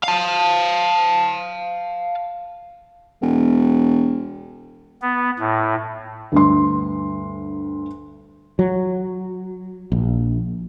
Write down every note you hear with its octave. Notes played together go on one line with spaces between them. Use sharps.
F5 A5
E1
B3
A2
D2 G2 C6
F#3
A#1